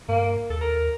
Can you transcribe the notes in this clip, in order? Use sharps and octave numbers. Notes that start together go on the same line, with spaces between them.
G2 A#3
D#2 A4
A#4